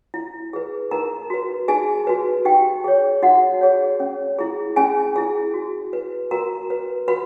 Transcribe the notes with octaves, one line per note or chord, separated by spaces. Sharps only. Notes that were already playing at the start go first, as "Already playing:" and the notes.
E4
G#4 B4
D#4 A#4 A#5
F#4 B4
D#4 G#4 G#5
F#4 B4
D#4 G4 G5
G#4 C#5
D#4 F#4 F#5
G#4 C#5
C#4
E4 G#4
C#4 G#4 G#5
E4 G#4
F#4
B4
F#4 A#4 A#5
B4
F#4 B4 B5